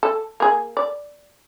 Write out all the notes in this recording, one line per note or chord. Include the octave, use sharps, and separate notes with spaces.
A4
A#3 G#4
D5